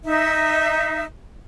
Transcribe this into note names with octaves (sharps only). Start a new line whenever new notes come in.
D#4 E5